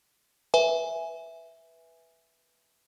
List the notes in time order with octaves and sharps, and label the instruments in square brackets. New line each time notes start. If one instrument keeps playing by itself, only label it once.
[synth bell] B4 E5 G#5